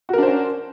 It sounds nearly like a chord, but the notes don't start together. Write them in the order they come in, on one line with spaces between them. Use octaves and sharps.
F#4 A#4 D4 C5 C#4